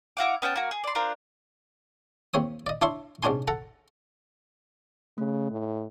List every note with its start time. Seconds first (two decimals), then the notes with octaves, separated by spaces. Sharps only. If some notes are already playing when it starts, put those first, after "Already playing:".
0.17 E4 F#4 F5 D6
0.42 B3 C#4 G5 A5
0.56 A#3 F#4
0.71 G#4
0.84 D5 C6
0.95 D4 F4 A#4 C5
2.34 D#2 C4 C#5 D#6
2.67 D5 D#5
2.82 D4 E4 C#5 E5 C6 C#6
3.23 C2 G#2 C#4 D4 G#5 C6
3.48 A4 F#5 A#5
5.18 C#3 A3
5.51 A2